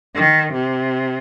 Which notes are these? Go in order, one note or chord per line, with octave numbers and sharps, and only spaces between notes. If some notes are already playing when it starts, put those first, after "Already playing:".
D#3
C3